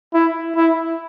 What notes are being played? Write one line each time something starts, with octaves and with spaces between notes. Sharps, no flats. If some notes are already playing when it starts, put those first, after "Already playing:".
E4
E4